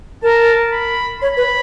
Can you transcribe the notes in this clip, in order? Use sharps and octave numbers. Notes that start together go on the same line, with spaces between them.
A#4 A5
B5
C#5 B5
B4